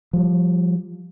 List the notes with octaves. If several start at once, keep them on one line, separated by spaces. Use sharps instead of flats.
F3 G3